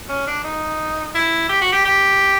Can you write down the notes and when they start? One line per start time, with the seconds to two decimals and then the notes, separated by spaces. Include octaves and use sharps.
0.09 C#4
0.27 D4
0.44 D#4
1.15 E4
1.49 G4
1.61 F#4
1.72 G4
1.85 G4